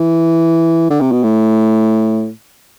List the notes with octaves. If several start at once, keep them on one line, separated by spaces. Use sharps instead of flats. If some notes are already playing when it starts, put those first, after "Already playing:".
Already playing: E3
D3
C3
B2
A2